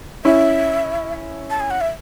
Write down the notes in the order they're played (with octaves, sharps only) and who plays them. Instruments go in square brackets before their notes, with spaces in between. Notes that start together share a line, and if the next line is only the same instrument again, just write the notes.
[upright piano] C#4 E4 [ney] E5
[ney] A5
G#5
F#5
E5